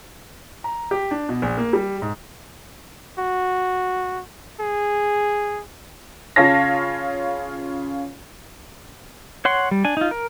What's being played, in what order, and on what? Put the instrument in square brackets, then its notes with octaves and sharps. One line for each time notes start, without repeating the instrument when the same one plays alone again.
[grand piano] A#5
G4
D4
B2
A#1
A#3
G3
G#2
[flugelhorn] F#4
G#4
[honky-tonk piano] C#3 F4 C#5 F5 A5 A#6
[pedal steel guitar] C#5 F#5 C6
G3
D4 G#5
D#4 F4
A#4